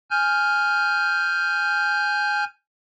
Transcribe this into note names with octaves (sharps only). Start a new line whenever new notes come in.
G#5 F6 G6